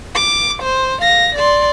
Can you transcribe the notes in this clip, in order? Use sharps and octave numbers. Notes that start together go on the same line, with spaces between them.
D6
C5
F5 A#6
D5 C6